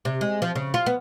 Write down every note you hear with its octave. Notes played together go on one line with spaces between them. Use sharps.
C3
G#3
F3
C#3
F4
B3